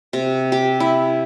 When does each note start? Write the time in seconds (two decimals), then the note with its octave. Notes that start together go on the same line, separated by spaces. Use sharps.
0.13 C3
0.52 G4
0.80 E4